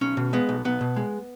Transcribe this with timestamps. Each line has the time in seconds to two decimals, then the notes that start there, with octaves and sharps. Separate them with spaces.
0.01 B1 C#4
0.17 B2
0.33 G#3 B3
0.49 B1
0.65 B1 B3
0.81 B2
0.96 G#3